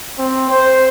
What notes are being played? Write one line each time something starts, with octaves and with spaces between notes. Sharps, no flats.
C4
C5